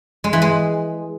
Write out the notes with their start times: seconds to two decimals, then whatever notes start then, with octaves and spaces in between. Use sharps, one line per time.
0.24 G#3
0.33 E3
0.42 G#3